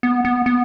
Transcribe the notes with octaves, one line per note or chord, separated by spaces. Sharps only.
B3
B3
B3